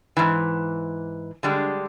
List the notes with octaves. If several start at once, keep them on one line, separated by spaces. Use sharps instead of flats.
G#2 E3
D3 G3 G#3